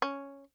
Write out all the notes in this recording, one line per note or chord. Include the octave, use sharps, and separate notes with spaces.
C#4